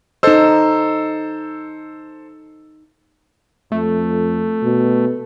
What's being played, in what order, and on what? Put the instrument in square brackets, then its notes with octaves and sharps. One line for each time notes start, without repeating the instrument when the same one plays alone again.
[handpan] D#4 D#5 [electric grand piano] A4 C5 E6
[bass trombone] F2 [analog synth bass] A3
[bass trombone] B2